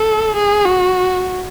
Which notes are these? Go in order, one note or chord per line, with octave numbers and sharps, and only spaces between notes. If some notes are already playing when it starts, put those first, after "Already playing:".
Already playing: A4
G#4
F#4